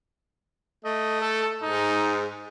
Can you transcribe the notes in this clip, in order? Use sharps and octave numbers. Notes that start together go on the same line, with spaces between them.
A3 D#5
A4
G#2 D#4